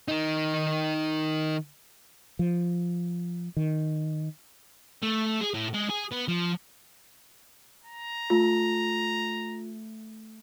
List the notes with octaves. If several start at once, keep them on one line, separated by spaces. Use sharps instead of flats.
D#3 D#4
F3
D#3
A3
G#4
A2
G#3
G#4
B3
F3
A#5
A3 F4